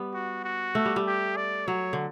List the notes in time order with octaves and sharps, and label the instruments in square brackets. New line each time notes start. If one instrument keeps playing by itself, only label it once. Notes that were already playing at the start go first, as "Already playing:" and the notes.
Already playing: [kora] G3 B3
[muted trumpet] F#4
F#4
[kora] A3
G3
G3
[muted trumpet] G4
D5
[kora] F#3 [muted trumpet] C#5
[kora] D3